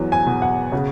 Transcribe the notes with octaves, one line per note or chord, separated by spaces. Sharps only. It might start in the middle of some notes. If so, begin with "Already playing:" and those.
Already playing: E2 F#3
G#5
B2
F#5
C#3 F#4